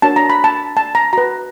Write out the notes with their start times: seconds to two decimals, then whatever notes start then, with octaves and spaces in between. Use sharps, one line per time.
0.02 D4 F#4 A#4 C#5 A5
0.16 A#5
0.30 B5
0.44 A5
0.77 A5
0.95 A#5
1.13 F#4 B4 A#5